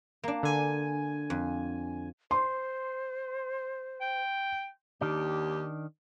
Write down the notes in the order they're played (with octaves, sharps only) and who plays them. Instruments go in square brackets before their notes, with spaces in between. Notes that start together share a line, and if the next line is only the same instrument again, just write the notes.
[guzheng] A#3 D4
[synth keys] D3 G#5
[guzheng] F2
[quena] C5 [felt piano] C6
[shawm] G5
[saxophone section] D#2 G4 [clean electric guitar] D#3 D4